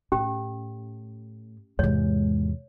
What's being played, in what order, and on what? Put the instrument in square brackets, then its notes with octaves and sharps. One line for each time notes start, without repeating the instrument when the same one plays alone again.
[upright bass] A2 [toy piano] C#4 G4
[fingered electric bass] E2 G#2 [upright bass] C3 G#3 [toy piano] C#5